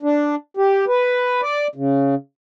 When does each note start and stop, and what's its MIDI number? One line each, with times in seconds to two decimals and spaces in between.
0.03 0.35 62
0.57 0.85 67
0.88 1.41 71
1.42 1.67 74
1.75 2.15 49